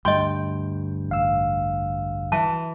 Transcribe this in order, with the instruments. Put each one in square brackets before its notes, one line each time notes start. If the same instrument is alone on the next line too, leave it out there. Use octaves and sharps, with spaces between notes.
[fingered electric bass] D2 G2 [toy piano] D#5 C6 [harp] G5
[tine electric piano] A1 F5 E6
[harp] E3 [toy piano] A5